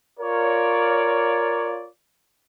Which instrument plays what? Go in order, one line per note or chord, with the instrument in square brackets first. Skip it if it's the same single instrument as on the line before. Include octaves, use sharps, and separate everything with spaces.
[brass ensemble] F4 A#4 C#5 D5